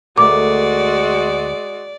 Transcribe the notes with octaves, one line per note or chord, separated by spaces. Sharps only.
D2 G#3 A3 F#4 A#4 D5 D6